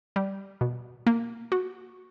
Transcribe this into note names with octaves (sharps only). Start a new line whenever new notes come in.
G3
B2
A#3
F#4